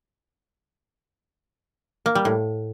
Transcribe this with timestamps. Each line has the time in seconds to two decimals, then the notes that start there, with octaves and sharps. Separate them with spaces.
2.06 A#3
2.15 G3
2.25 A2